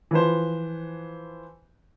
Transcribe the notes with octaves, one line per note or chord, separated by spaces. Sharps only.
E3 F3 B4 C5